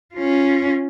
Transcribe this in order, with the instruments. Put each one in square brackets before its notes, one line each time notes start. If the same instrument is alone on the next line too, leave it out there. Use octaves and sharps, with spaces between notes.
[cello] C#4 F4